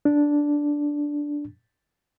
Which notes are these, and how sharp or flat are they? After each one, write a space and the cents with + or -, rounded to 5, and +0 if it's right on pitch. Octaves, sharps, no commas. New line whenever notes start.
D4 -5